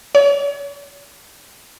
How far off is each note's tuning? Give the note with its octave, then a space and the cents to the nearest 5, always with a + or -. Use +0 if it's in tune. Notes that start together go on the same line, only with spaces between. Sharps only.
C#5 +40